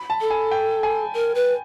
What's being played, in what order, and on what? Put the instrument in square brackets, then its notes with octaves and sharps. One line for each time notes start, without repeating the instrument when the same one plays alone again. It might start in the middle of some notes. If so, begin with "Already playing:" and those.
Already playing: [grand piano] B5
A5
[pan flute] A4
[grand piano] G#5
G5
G#5
[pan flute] A#4
B4